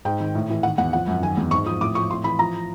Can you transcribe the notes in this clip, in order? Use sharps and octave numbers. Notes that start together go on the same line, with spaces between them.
G#2 G5
D#3
A2
E3
D#3 F#5
E2 F#5
F3 F#5
F#2
D#3 G#5
E2
G#2 C#6
F3 D#6
A2 D6
F3 C#6
A2 C6
E3 B5
F3 A#5